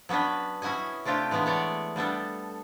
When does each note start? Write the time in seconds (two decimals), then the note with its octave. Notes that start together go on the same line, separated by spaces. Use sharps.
0.09 F#3 B3 C#4 D4 B4
0.62 C#4 E4 F#4 D#5 G#5
1.05 C3 A3 D4 F4 G4
1.31 E3 G#3 A3 B3 D4
1.46 B3 C#5 D5
1.96 G3 B3 D4 A4